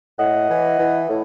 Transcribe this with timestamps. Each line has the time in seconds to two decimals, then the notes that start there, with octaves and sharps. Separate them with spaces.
0.19 A2 D#5 F#5
0.49 E3
0.79 E3
1.09 A2